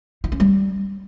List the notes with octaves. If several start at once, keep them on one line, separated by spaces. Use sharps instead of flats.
D#4
C#4
G3